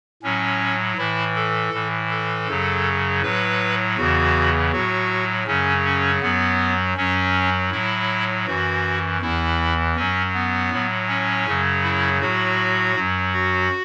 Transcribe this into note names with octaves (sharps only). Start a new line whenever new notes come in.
A2 F#3 C#4
A2 E3 E4
A4
A2 E3
A4
F#2 C#3 F#3
A2 F#3 B4
E2 C#3 E3 F#4
A2 F#3 F#4
F#2 C#3 F#3 C#4
C#4
F#2 F#3 B3
F#2 F#3 C#4
A2 F#3 E4
F#2 E3 F#4
E2 E3 E4
F#2 F#3 C#4
B3
A2 F#3
C#4
F#2 C#3 F#3
E4
A2 F#3 F#4
F#2 F#3
F#4